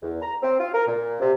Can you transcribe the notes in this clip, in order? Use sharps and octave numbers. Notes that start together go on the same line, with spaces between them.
E2
A#5
C4
F4
A#4
A#2
C3